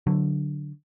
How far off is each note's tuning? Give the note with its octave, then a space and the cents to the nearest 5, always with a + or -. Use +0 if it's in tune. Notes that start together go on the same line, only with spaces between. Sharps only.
D3 +0 F#3 +0